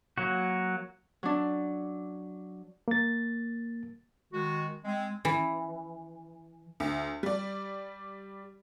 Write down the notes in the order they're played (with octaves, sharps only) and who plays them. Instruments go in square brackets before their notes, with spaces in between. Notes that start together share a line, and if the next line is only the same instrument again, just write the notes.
[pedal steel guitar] F#3 A#3 F#4
[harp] F#3 D4
[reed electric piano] A#3 A6
[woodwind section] D#3 G#3 F#4
G#3 C4
[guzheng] E3
[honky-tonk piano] D2
G3 D5